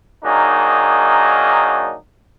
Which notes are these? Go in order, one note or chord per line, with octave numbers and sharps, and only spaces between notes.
D#3 F#3 A#3 D4 D#4 G#4